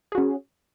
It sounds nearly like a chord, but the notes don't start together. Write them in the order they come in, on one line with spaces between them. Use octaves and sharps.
G#4 F#4 C#4